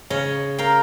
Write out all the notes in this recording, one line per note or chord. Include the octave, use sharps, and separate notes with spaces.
C#3 C#5 D#5
A#4 F5 G5